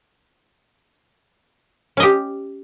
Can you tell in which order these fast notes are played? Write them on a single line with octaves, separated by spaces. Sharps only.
C#4 D#5 G4